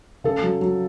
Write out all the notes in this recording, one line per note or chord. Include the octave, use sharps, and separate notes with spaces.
C#3 A4
F#3
F#3